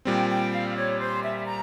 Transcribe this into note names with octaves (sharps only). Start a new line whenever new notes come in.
A#2 G3 C4 G5
G5
F5
C#5
C5
E5
A#5